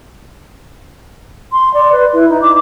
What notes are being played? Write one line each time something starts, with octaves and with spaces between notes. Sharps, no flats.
C6
D5
B4
E4
D#4
D6